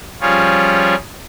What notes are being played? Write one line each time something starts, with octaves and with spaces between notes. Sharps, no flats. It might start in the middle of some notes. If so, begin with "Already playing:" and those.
F3 G3 C#4 F4 G#4 C#5